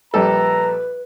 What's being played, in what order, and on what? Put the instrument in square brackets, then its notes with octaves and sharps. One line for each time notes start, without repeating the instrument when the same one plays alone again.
[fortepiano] A#1 G3 A4 [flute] B4 [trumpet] A#5